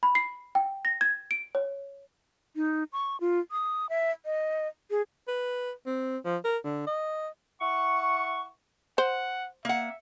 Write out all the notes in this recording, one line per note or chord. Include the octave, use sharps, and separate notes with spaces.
B5
C7
G5
A#6
G#6
D7
C#5
D#4
C#6
F4
D#6
E5
D#5
G#4
B4
C4
F3
A#4
D3
D#5
E4 F#5 C#6
C5 F#5
A#3 E5 F#5